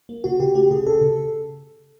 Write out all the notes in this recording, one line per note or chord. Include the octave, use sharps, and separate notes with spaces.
A#3
C#3 F#4
C#3 G4
A3 G4
C#3 G#4
C#3 A4
C#3